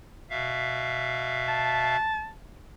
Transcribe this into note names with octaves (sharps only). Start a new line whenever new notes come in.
B2 E5 F5
A5